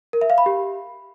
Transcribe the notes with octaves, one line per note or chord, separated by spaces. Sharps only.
A#4
E5
F5
B5
G4